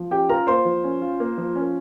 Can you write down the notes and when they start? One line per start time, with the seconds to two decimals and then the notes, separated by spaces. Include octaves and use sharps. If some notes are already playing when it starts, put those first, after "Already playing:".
Already playing: F3
0.11 C#4 G4 G5
0.29 F4 A#4 A#5
0.47 A#3 C5 C6
0.65 F3
0.84 C#4
1.02 F4
1.20 A#3
1.38 F3
1.56 C#4